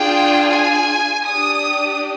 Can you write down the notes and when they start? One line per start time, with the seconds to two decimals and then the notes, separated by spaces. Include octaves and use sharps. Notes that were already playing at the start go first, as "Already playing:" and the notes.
Already playing: D4 F4 G#4 G5
0.50 G#5
1.24 D4 G4 D#6